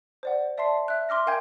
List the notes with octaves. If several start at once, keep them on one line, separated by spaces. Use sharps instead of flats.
C5 D5 F#5
D5 E5 A5 C6 C7
E5 F#6
E5 C6 D6 F6 A#6
A#4 F5 G5 G#5 G6 G#6